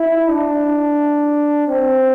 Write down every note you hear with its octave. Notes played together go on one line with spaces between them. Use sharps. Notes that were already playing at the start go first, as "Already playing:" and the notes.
Already playing: E4
D4
C4